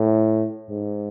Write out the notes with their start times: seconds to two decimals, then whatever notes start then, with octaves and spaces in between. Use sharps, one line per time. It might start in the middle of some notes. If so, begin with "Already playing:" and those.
Already playing: A2
0.69 G#2